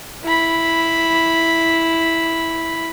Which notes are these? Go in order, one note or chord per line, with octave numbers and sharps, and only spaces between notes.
E4 B5